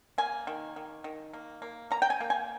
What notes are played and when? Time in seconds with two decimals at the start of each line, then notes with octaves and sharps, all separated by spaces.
0.18 A#3 G#5
0.47 D#3
0.76 D#3
1.04 D#3
1.33 A#3
1.62 A#3
1.91 A#3 A#5
2.02 G5
2.10 G#5
2.21 A#3
2.30 G#5